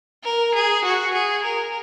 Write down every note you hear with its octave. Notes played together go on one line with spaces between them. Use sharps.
A#4
G#4
F#4
G#4
A#4